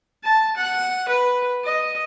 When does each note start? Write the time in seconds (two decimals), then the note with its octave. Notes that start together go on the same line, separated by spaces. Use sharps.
0.24 A5
0.57 F#5
1.08 B4
1.64 D#5